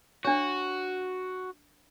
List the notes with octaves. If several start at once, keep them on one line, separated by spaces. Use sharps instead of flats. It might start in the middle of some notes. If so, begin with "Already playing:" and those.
D4 F#4 C#5